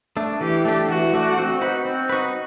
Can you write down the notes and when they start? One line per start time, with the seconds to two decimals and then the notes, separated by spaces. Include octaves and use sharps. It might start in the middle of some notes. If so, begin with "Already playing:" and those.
0.17 A3 D4
0.41 E3 G4
0.65 A3 D4
0.89 E3 F#4
1.14 A3 D4
1.38 C4
1.61 D#4 F#4 B4
1.85 C4
2.09 D#4 F#4 B4